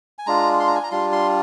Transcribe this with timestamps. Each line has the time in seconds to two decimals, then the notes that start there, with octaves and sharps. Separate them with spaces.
0.19 G#5
0.27 G#3 D4 F4 A#5
0.60 C6
0.67 A#5
0.75 G#5
0.83 A#5
0.91 G3 D4 F4 C6
1.12 C6